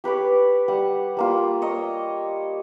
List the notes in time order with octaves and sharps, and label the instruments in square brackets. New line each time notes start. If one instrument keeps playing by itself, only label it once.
[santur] G4 B4 C#5 D6
G3 F#5
G3 A#3 F4
C#5 D#5 A#5